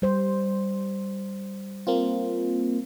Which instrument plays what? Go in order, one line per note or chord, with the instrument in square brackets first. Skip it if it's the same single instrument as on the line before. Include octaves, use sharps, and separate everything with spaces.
[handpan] G3 C5
[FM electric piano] A#3 C4 F4